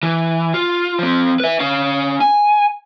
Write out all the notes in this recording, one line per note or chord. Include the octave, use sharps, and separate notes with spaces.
E3
F4
F3 C4
B4 E5
C#4 F5
G#5